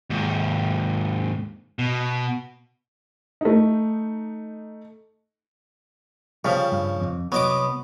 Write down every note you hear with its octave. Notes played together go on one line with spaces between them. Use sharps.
D#2 G#2
B2
A3 D#4
C#3 F3 G3
G2
F2
C2 F#3 B3 D#5 D6